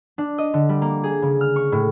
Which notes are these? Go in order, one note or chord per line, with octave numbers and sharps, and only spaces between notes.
D4
D#5
D3
G3
A#3
G#4
C#3
F6
C#6
A2